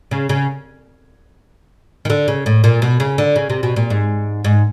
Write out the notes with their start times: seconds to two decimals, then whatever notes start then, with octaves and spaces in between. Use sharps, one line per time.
0.11 C#3
0.29 C#3
2.05 D#3
2.10 D3
2.28 C#3
2.46 A2
2.64 A#2
2.82 B2
3.00 C#3
3.18 D3
3.36 C#3
3.50 C3
3.63 B2
3.76 A#2
3.90 G#2
4.44 G#2